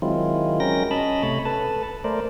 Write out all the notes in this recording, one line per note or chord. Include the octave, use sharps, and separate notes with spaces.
D#3 F#3 G#3 C4 E4 F4
F#3 G#3 C#4 A#4 G5 A#6
C#4 D#5 A5 B5
C3 A3 C#5 B5
A4 B4 A5
A3 A#4 C5 D5